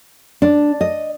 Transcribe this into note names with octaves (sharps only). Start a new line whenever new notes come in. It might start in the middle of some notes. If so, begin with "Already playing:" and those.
D4
D#5